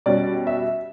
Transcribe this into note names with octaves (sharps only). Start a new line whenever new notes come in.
B2 G3 C#4 D5
E5